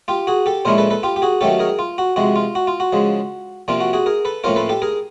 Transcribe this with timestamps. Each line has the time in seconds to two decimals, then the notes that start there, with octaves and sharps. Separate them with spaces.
0.08 F4 G4
0.27 F#4 G#4
0.46 G4 A4
0.65 A#2 F3 G#3 C#4 E4 A#4 C5
0.78 A4 B4
0.90 A4 B4
1.03 F4 G4
1.16 G4
1.22 F#4 G#4
1.41 D#3 F#3 A3 C#4 G4 A4
1.59 G#4 A#4
1.79 F4
1.98 F#4
2.16 C3 F3 G#3 F#4
2.36 F4
2.55 F#4
2.67 F4
2.80 F#4
2.93 C#3 F3 G#3
3.68 C3 F3 A#3 D4 F4
3.81 F#4
3.93 F#4 G#4
4.06 G#4 A#4
4.25 A4 B4
4.44 A2 F3 A#3 C#4 F4 A#4 C5
4.56 A4 B4
4.69 G4 A4
4.82 G#4 A#4